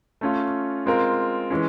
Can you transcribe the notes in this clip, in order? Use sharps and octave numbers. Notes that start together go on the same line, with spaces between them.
A3 C#4 F4
G#3 C4 F4 A#4
E3 G#3 C#4